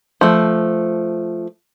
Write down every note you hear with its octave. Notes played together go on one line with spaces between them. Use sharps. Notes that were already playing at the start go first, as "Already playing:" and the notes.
F3 A3